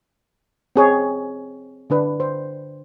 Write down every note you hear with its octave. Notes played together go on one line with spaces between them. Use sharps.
C4 G#4 C#5
D3 D4 B4
C5